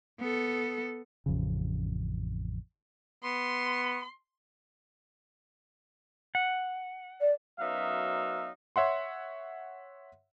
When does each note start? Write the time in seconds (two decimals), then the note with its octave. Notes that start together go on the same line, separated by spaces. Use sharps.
0.20 B3 A4
1.26 A1 F2 C#3
3.24 B3 C6
6.35 F#5
7.21 D5
7.60 F#2 F#3 B3 D#4 E5 F5
8.76 C#5 E5 F#5 C6